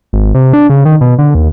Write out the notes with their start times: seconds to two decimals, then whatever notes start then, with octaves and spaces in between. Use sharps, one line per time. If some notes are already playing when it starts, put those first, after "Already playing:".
0.13 G#1
0.35 C3
0.53 D4
0.70 C#3
0.85 D#3
1.01 B2
1.18 D3
1.35 D#2